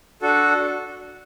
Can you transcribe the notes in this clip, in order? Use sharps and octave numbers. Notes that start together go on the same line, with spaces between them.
D4 F#4 A4